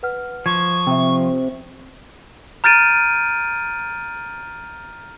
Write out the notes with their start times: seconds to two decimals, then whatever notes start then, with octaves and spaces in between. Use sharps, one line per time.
0.03 B4 F#5 F6
0.46 F3 C#6 G#6
0.87 C3 E5 G5
2.64 A#5 F6 G6 A6 D7 D#7